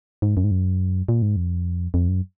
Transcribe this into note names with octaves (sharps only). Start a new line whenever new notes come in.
G#2
F#2
G#2
F#2
A#2
G#2
F2
F2
F#2